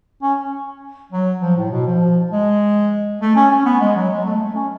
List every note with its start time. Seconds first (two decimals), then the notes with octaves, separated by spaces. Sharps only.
0.22 C#4
1.12 F#3
1.42 F3
1.57 A2
1.71 B2
1.87 F3
2.32 G#3
3.21 A3
3.36 C#4
3.51 C#4
3.65 B3
3.81 G#3
3.95 F#3
4.10 G#3
4.25 A3
4.40 A3
4.55 C#4